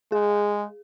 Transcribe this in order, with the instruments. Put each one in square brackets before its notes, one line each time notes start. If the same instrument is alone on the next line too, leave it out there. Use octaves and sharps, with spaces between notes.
[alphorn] G#3 [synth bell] G#4